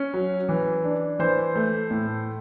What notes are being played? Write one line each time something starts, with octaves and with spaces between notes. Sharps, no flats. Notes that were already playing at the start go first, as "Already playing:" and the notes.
Already playing: C#4
F#3
E3
D4
E3 C5
A3
A2